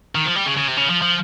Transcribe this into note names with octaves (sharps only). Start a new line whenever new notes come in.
D#3
F3
G3
C#3
C#3
C3
C#3
F3
F3